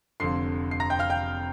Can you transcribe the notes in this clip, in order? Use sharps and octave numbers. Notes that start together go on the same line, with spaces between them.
F1 F2 D3 C6 C7
C7
A#5 A#6
G5 G6
F5 F6
G5 G6